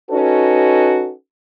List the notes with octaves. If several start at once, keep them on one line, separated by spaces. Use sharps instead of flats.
C#4 D#4 F#4 A4 B4